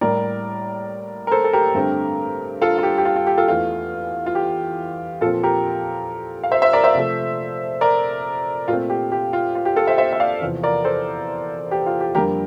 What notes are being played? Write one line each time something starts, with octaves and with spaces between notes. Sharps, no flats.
A2 G3 A#3 A#4 D5
A#4
A4 C5
A4
G4 A#4
G2 D3 A3 C4
F4 A4
F4
G4
G4
F4
F4
G4
F4 A4
E2 E3 A3 F4
F4
G4
A#2 F3 C4 F4 A4
G4 A#4
F5
C5 E5
C5 E5
A#4 D5
C5 E5
C3 F3 A3
A#4 D5
A#2 A3 C4 F4
G4
G4
F4
F4
G4
F4 A4
C5 E5
C5 E5
E5
D5 F5
E2 C3 F3
A#4 D5
A4 C5
G4
F4
G4
F2 D3 G3 A#3 G4 A#4